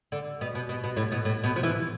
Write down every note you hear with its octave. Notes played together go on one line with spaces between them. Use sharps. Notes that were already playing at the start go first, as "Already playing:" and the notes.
D3
B2
B2
B2
B2
A2
B2
A2
B2
F3
E3